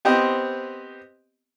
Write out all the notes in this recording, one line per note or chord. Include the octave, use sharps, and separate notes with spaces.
B3 C4 G4 C5 D#5